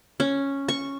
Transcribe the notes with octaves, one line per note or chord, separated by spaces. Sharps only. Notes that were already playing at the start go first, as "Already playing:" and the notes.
C#4
C#6